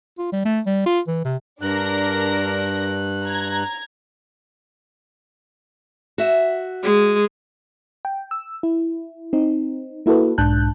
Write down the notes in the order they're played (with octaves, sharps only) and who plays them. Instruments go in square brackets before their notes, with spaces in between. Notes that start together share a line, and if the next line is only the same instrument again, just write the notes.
[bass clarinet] F4
G3
A3
G3
F4
E3
C3
[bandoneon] G2 F#6 [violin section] D4 A#4 A#6
[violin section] A#5 G#6
[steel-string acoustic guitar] F#4 E5
[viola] G#3
[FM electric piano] G5
E6
E4
C4 D#4
A#3 E4 F#4 A4 B4
B1 G#2 D4 A5 F#6 G6